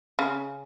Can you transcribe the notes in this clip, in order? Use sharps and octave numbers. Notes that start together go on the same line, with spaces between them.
C#3